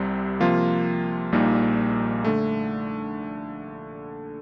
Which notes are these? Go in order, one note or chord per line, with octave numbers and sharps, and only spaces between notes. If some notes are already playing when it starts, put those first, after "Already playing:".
Already playing: C2 C3 G3 C4
C3 F3 A#3 F4
A#1 A#2 G3 A#3 D#4
D3 A3